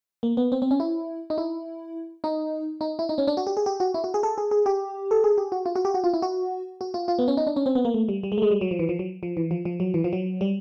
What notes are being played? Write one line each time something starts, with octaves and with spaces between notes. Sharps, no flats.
A#3
B3
C4
C4
C#4
E4
D#4
E4
D#4
D#4
E4
D#4
C#4
D4
F#4
G4
G#4
G4
F#4
E4
F#4
G#4
A4
G#4
G#4
G4
A4
G#4
G4
F#4
F4
F#4
G4
F#4
F4
E4
F#4
F#4
F4
F4
B3
C#4
D#4
D4
C#4
C4
B3
A#3
A3
G3
G3
G#3
A3
G#3
G3
F#3
F3
E3
F3
F#3
F3
E3
F3
F3
F#3
E3
F3
F#3
G3